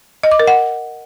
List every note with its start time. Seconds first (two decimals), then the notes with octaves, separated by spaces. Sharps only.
0.23 D#5
0.31 D6
0.39 A#4
0.47 F#5